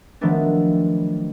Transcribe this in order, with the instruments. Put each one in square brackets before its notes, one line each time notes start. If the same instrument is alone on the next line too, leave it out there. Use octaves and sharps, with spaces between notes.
[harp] D#3 F3 F#3 A3 B3 D4